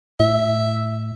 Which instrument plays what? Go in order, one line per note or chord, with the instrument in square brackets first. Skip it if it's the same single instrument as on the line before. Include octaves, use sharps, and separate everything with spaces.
[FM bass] A2 [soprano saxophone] E5